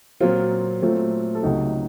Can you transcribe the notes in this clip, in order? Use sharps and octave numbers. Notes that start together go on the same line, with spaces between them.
A#2 F#3 C4 F4
A#2 F#3 A3 C4
A4
C#2 C3 F#3 A3 D#4 F#4